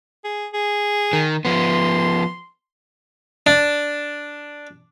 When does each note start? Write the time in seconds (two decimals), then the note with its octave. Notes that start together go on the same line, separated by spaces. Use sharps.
0.24 G#4
0.53 G#4
1.13 D#3
1.45 F3 B3 C6
3.47 D4